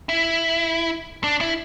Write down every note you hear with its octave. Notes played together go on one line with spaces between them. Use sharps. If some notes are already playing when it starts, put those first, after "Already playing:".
E4
D4
E4